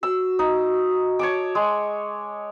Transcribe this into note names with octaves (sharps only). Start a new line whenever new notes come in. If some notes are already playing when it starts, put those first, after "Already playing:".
F#4 E6
D#4
C#5 A5 D6
G#3